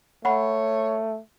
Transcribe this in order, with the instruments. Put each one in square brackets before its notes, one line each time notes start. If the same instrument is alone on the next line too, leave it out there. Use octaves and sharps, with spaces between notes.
[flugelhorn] A3 [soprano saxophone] C#5 [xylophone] F#5 B5